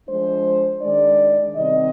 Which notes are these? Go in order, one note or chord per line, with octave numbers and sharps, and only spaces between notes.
F3 G#3 D4 C5
D#3 G#3 D4 D5
C3 D#3 G3 C4 D#5